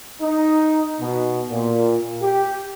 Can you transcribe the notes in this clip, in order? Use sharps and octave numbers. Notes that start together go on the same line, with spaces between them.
D#4
B2
A#2
G4